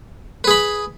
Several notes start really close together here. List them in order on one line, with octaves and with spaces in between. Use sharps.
B4 G#4 B5